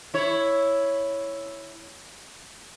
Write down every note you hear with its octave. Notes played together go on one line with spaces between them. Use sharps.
E4 C#5